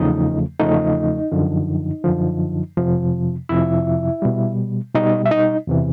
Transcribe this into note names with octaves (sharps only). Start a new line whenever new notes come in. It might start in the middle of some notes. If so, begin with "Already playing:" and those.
Already playing: E2 C#3 F3 A3 D#4 D#5
E2 C#3 F3 A3 D#4 D#5
F#2 D3 F3
F#2 D3 F3
F2 C3 F3
F2 C3 F3 E4 E5
B2 G3
B2 G3 D#4 D#5
E5
D#4 D#5
E2 C3 E3